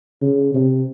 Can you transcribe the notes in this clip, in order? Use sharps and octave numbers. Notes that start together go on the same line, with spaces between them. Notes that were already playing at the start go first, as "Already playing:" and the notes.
C#3
C3